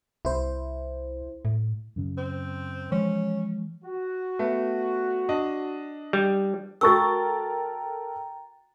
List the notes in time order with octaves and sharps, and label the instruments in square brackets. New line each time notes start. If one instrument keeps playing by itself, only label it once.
[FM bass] C2 [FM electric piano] E4 C5
[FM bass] A2
[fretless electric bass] F#2 C#3
[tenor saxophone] C4
[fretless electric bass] E3 F3 G#3 [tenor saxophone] C#4
[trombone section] F#4
[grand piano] A3 B3
D4 D#5
[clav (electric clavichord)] G3
[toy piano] F#4 C#6 E6 [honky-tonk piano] A4 A#4 A6 [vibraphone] G5 A#5